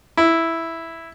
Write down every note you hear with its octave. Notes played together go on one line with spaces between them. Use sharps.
E4